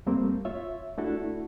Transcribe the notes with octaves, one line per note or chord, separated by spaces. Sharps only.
F2 G3 A3 A#3 C4
F4 C#5 E5
A3 D4 E4 F#4 A4